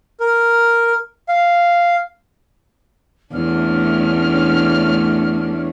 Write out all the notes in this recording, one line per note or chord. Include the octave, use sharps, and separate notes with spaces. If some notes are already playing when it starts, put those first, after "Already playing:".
A#4
F5
E2 A3 C#4 D4 F6